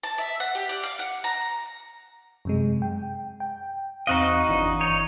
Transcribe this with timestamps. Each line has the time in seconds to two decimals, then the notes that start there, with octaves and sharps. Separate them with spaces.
0.03 A5
0.18 E5
0.40 F#5
0.55 G4
0.69 D5
0.83 F5
0.99 F#5
1.24 A#5
2.45 F#2 C3 G#3
2.82 G5
3.40 G5
4.07 E2 C4 D#4 F#4 D#5 F5
4.48 G1 E3 D4
4.81 D#4 C#5